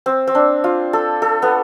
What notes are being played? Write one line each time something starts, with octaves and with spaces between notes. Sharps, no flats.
C4
C4
D4
F4
A4
A4
B3